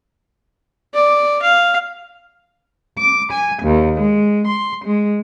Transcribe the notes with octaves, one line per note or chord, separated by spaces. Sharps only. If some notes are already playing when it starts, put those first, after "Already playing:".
D5
F5
D6
G#5
D#2
G#3
C6
G#3